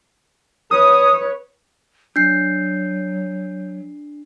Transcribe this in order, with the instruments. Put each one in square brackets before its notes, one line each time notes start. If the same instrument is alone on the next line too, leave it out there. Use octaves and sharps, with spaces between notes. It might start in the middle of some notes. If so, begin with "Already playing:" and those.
[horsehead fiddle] B4 C#5 [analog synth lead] D#6
[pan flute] F#3 [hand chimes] D4 C7 [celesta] G6